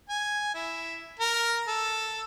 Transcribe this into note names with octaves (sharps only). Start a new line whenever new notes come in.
G#5
E4
A#4
A4